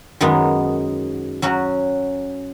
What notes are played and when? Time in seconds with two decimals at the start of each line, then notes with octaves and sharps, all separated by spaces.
0.21 F#2 D#3 G#3 B3
1.42 F#3 C#4 F#4